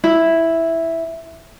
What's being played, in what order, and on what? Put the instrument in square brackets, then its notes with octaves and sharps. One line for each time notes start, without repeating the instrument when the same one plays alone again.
[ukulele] E4